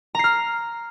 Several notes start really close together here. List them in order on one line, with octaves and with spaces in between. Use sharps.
A#5 C7 F6